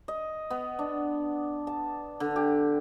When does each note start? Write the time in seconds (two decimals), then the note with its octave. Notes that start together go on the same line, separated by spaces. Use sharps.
0.08 D#5
0.50 B3
0.79 D4
1.67 A5
2.20 D3
2.36 G4